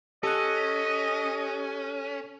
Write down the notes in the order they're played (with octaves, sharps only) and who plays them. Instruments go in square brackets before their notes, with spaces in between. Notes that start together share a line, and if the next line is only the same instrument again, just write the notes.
[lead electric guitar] C#4 [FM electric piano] G4 F#6 [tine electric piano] A4 [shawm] D#5